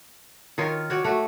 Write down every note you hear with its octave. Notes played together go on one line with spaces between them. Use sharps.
D#3 F4 A#4 C#5
F#4 C#5 D5
A3 F#4